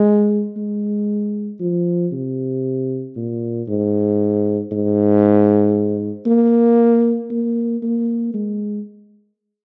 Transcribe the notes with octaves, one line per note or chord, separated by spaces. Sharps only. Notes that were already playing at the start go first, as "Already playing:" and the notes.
Already playing: G#3
G#3
F3
C3
A#2
G#2
G#2
A#3
A#3
A#3
G#3